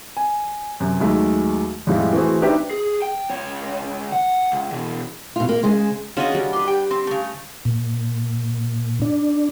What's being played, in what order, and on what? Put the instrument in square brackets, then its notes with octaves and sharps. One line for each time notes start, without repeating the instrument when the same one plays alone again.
[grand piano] G#5
F#2 C3
D#2 F#3 G#3 A3
F2 A2 G3 G#3 E4 F4
E3 A3 C4 F#4 G#4
C4 D4 D#4 G4 B4 E5
[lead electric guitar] G#4
G5
C#2 C#5
F#5
C#2
B2 E3
[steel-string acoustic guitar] B2 F4
A#3
C#3 G#3 C5
[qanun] C#3 D4 [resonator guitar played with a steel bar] F4 F#4 D#5
[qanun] G3 D4
[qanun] B4 C6 [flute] D6
[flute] G4 [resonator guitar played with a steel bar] G5
[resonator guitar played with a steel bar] C4
C#3 A3
[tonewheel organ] A#2
D4